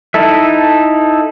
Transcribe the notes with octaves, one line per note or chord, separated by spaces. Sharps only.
D#4 E4 A4 E5